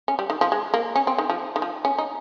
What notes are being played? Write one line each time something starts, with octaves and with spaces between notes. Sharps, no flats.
C#4
G3
D#3
F3
G#3
A#3
C#4
C4
D#3
F3
D#3
F3
C#4
D#4